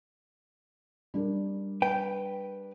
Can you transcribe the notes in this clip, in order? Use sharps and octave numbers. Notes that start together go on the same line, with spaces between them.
G3 D4 A#4
B4 G5